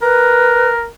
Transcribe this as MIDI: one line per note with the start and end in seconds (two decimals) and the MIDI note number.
0.02 0.88 70
0.02 0.69 71